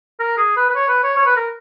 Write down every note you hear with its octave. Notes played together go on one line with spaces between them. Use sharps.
A#4
G#4
B4
B4
C#5
B4
C#5
C#5
B4
A#4